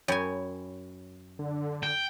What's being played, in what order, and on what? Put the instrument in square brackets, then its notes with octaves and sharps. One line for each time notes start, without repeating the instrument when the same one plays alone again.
[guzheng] F#2 G#5 [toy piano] C#5 G5 B5
[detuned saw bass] D3
[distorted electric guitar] G5